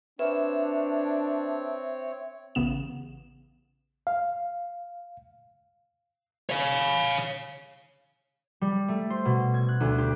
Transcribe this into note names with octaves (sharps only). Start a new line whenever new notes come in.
C4 D4 B4 C#5 E5
A1 C#3 B3 E7
F5
C#5 F5
G3
A3
C5
B2
G#6
F#6
D2
G4